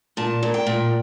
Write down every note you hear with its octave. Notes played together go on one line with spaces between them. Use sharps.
A#2 A5
A#2
G5
A#2